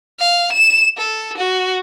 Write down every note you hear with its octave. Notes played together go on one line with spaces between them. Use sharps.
F5
E7
A4
F#4